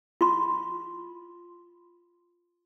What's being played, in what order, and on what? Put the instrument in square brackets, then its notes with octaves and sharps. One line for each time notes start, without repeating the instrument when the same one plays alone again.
[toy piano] F4 C6